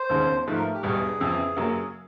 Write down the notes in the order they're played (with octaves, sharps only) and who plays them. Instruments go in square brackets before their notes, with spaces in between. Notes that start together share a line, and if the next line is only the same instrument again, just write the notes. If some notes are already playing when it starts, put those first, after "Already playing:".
Already playing: [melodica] C5
[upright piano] E1 D#2 C#3
[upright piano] G#2 F3 A3 [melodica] B4
[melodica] A#4
G4
[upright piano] E1 E2 B2 G3 [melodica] G#4
[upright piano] F2 C#3 E3
F#2 C#3 F#3 A#3